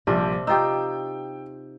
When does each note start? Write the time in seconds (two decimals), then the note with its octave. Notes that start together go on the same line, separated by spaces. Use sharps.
0.07 A#1 C3 F3 G3 D4
0.47 D#4 F4 G4 G5 E6